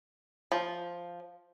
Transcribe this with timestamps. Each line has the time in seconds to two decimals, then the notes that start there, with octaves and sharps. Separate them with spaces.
0.52 F3